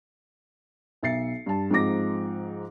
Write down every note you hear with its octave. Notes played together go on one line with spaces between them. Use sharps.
B1 E5 A6 C7 C#7
G2 A5
G#2 F3 C4 D#4 D6 A#6